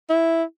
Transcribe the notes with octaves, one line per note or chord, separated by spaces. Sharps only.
E4